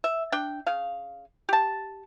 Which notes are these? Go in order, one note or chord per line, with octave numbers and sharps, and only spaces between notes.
E5
D4 G5
C#3 F5
G4 A5